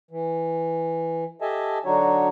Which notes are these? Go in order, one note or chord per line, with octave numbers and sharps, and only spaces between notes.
E3
G4 A4 D#5 E5 G#5 A5
D3 F#3 D4 D#4 F#4 C#5